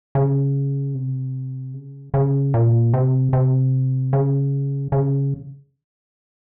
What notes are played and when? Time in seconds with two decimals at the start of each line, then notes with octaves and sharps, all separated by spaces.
0.15 C#3
0.95 C3
1.73 C#3
2.14 C#3
2.54 A#2
2.94 C3
3.33 C3
4.13 C#3
4.92 C#3